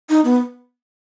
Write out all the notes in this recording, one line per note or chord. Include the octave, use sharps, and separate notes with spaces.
D#4
B3